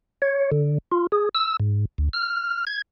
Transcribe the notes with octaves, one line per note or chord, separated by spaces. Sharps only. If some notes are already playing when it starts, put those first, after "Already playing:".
C#5
D3
F4
G#4
E6
G#2
D2
F6
G#6